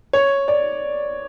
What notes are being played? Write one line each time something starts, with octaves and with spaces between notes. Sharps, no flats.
C#5
D5